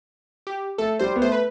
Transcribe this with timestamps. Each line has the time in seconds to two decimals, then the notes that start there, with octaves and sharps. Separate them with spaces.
0.47 G4
0.78 A3 A4
0.99 G3 C5
1.16 B3
1.21 A3 C5
1.32 B4